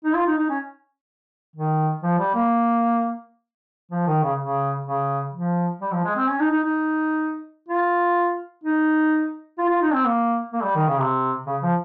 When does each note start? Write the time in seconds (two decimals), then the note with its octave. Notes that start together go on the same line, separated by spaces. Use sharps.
0.04 D#4
0.14 F4
0.26 D#4
0.38 D#4
0.49 C#4
1.56 D#3
2.03 F3
2.19 G3
2.35 A#3
3.91 F3
4.07 D#3
4.23 C#3
4.39 C#3
4.86 C#3
5.33 F3
5.81 G3
5.92 F3
6.04 G#3
6.16 C4
6.28 C#4
6.40 D#4
6.51 D#4
6.64 D#4
7.69 F4
8.64 D#4
9.58 F4
9.69 F4
9.82 D#4
9.93 C4
10.05 A#3
10.53 A#3
10.63 G3
10.75 D#3
10.88 C#3
10.99 C3
11.46 C#3
11.62 F3